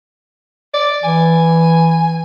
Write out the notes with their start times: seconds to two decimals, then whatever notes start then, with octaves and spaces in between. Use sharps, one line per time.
0.74 D5
1.04 E3 G#5